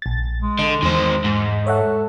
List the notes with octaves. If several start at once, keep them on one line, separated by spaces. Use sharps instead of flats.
A#1 A6
G#3
D3 D#5
E2 D#3 C5
G#2
A4 C#5 E5 F#5